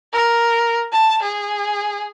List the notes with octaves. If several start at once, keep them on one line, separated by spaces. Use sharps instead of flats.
A#4
A5
G#4